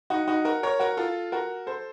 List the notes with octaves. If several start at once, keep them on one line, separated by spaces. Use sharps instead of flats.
D#4 F#4
D#4 F#4
F#4 A#4
A#4 C#5
F#4 A#4
F4 A4
F#4 A#4
A4 C5